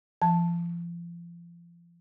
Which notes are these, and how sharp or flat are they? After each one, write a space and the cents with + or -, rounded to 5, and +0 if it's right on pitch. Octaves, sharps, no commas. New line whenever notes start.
F3 -35 A5 +0